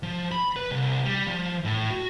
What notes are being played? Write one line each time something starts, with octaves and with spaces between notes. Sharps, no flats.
F3
B5
B4
C2
G3
F3
A2
F#4